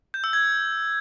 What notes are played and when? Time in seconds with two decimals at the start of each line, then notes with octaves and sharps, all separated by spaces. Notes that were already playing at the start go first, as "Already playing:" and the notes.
0.14 G6
0.24 E6
0.33 G#6